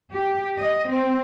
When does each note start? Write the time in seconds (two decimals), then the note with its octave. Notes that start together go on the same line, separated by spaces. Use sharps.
0.13 G4
0.57 D#5
0.89 C4